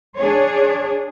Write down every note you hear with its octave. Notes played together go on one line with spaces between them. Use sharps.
D4 G#4 C#5